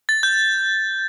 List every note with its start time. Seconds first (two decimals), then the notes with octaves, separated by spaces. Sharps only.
0.09 A6
0.23 G6